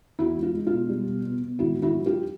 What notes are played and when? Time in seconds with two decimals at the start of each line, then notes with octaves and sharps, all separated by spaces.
0.19 E2 E4 F#4
0.37 G#3
0.43 F4
0.54 G#3
0.67 F4
0.72 B2
0.89 G3
1.07 B2
1.25 B2
1.43 B2
1.59 G#1 E4 F#4
1.76 G#1
1.82 E4 F#4
1.95 F#3
2.06 F4 G4